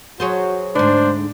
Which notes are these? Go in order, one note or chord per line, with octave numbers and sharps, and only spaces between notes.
F#3 F#4 G#4 C5
D2 G#2 D4 C5